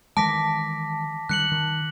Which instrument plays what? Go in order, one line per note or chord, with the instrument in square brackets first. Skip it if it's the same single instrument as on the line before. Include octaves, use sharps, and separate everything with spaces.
[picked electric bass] D#3 E3 G#3 [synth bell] A5 [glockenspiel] D6 A#6 B6
[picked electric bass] D#3 G3 [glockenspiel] F#6 C#7 F#7
[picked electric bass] D#3